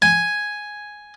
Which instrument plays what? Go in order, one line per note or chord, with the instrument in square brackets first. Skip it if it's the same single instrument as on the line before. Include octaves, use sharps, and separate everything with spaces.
[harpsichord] G#5